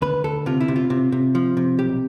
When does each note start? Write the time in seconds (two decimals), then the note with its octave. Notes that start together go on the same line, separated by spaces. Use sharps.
0.02 D2 B4
0.24 D2 A4
0.46 C3 F4
0.60 E4
0.68 C3
0.76 F4
0.90 C3
1.12 C3
1.35 F3
1.57 C3
1.79 B1 G4